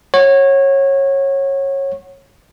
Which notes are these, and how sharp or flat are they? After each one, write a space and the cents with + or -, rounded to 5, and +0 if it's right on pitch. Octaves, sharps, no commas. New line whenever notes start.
C#5 -20 F#5 +0